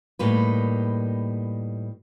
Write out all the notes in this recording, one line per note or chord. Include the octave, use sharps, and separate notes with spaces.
A2 G3 A#3 D#4 B4